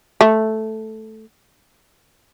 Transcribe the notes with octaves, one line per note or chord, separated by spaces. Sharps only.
A3